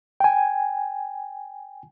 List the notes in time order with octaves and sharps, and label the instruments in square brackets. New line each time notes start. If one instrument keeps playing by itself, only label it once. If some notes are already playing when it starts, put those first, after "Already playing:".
[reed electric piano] G5 G#5